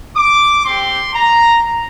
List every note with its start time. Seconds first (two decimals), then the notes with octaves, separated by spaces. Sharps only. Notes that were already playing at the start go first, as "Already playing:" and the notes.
0.15 D6
0.64 C4 G4 C6
1.14 A#5